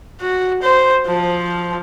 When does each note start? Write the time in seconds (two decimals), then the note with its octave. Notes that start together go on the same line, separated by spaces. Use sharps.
0.21 F#4
0.63 C5
1.07 F3